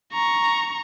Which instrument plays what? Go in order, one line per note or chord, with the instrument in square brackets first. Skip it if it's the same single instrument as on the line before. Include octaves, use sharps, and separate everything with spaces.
[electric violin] A#5 C#6